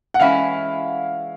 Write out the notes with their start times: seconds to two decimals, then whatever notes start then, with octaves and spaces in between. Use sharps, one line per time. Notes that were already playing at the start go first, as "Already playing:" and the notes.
0.14 F#5
0.20 E3 G#3 C#4 E4 F5